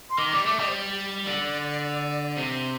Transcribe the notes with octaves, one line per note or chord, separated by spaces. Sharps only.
C6
D#3 D6
G3 D6
A3 D6
G3 D#5
C5
D5
D3
C3 C5